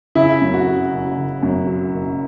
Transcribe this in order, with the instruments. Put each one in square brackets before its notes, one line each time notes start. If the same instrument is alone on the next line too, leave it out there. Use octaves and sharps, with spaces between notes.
[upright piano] C#3 E4
F#2
F#4
F#3
F#1
C#3
F#2
F#3
F#1